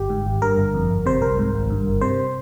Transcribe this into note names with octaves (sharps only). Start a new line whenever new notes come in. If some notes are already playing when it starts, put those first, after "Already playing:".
Already playing: G1 G4
G#2
G#1
G2 A#4
G1
F2
G1
C3 C5
C2 A#4
G#2
G#1
G2
G1
C3 C5